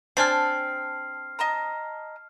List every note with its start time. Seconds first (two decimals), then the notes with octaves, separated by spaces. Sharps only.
0.17 C4 D4 G#5 A5 F6 C7
1.39 D#5 A5 A#5